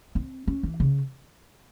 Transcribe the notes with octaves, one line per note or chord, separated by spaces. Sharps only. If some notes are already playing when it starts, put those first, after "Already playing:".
C4
C#4
E3
C#3